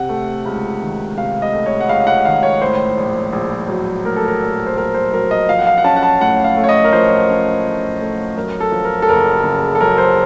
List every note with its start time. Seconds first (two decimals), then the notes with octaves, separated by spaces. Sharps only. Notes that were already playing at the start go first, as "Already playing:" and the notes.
Already playing: C3 F#5
0.09 A3
0.45 C#2
0.82 D#3
1.17 C3 F5
1.42 D#5
1.53 A3
1.66 C#5
1.80 F#5
1.89 C#2 F5
2.07 F#5
2.25 D#3 F5
2.43 C#5
2.62 A2 C5
2.98 A#1
3.33 A#1
3.69 F#3
4.05 A2 A#4
4.16 A4
4.28 A#4
4.42 A#1
4.66 C5
4.77 A#1 A#4
4.94 C5
5.12 F#3 A#4
5.31 D#5
5.49 F3 F5
5.59 F#5
5.67 F5
5.78 F#5
5.84 C#4 A5
5.96 F#5
6.03 A5
6.21 A2 F#5
6.44 F5
6.57 A3
6.64 C#5
6.69 D#5
6.84 A#4
6.93 F3 C5
7.29 C#4
7.65 A2
8.01 A3
8.37 F#2 A#4
8.60 A4
8.72 F3
8.84 A#4
9.02 A4
9.08 F#1 A#4
9.44 C#3
9.75 A4
9.80 F#2 A#4
9.98 C5